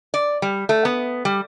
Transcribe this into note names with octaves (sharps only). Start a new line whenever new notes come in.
D5
G3
A3
B3
G3